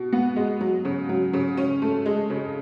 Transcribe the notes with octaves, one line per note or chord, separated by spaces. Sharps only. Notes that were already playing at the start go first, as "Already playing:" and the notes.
Already playing: B2
B3
G#3
F#3
C#3
F#3
C#3
C#4
A3
G#3
C#3